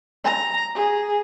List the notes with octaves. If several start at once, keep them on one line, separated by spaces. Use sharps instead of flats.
A#5
G#4